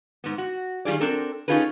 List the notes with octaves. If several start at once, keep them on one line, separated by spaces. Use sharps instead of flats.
G#2 B3
F#4
D#3 G3 F4 G#4 D5
C4 D4 A4 A#4
C#4 D#4 F4 G#4 A4 B4